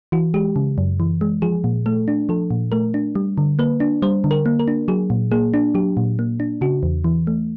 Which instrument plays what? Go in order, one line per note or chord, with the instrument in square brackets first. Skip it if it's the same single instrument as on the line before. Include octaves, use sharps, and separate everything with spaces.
[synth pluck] E3 F#4
G#3 G4
C#3
F#2
E3
G#3
F3 G#4
A#2
A3 A4
D4
F3 A4
A#2
A3 A#4
D4
G3
D3
A#3 B4
D4
G3 C5
D3
A#4
A#3
A#4
D4
F#3 G#4
A#2
A#3 G#4
D4
F#3 G4
A#2
A#3
D4
C#3 F#4
E2
E3
A3